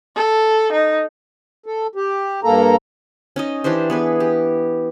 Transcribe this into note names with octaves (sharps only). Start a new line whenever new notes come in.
A4
D#4
A4
G4
G2 A#3 A4 A#5
C#4 D#4 D#5
E3 D4 G4 C5
B3 G#4 B4
G4